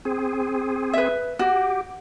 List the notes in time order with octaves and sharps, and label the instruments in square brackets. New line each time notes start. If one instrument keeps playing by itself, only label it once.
[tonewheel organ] C4 G#4
[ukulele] B4 E5
[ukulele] F#4 [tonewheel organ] G4